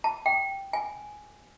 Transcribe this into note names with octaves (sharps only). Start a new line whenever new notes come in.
A5
G5
G#5